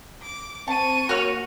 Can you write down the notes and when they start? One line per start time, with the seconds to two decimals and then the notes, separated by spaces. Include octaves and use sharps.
0.22 D6
0.68 C4 A5 C#6 D#7
1.09 A#3 F#4 C#5 F6